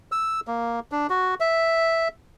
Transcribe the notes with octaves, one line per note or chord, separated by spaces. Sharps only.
E6
A#3
D4
F#4
E5